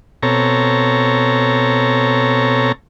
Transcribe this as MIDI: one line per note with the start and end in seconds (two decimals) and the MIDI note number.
0.23 2.72 47
0.23 2.72 60
0.23 2.72 69
0.23 2.72 73
0.23 2.72 82